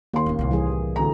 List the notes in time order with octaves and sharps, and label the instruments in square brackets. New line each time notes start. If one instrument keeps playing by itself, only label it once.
[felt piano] D#2 C6 [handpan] A#3
[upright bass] D1 C#4
C2 A2
[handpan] E3 G3 G#4
[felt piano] D2 A3 A#5